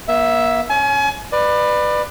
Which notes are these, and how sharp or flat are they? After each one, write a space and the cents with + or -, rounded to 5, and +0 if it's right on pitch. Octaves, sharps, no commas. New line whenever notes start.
A#3 +40 E5 +0
C#4 +0 G#5 +35
B4 +0 D5 +25